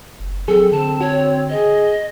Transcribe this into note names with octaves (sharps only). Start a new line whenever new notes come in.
F#1
F#3 C4 G#4 A4
D3 C4 A5
F#4 C#5
G#4 D#5